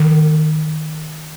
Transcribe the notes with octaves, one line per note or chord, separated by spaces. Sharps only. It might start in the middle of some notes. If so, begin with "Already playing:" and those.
Already playing: D#3